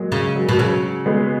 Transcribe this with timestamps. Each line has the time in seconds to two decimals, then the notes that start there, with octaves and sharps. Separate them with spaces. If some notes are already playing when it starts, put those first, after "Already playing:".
Already playing: F#3 G#3 A#3
0.12 C#3 F#3
0.35 F#3
0.49 B2
0.58 C#3 F#3
1.06 G#3 B3